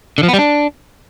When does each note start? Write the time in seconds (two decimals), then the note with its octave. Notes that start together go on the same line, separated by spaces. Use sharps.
0.18 D3
0.23 F3
0.28 B3
0.33 G3
0.39 D4